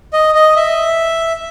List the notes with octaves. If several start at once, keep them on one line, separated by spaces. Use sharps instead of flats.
D#5
D#5
E5